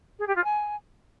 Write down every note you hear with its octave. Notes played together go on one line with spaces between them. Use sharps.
G#4
G4
F4
G#5